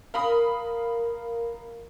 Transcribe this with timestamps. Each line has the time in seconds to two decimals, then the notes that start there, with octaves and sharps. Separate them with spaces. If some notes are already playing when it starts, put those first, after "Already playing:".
0.14 A#4 F5 B5 D#6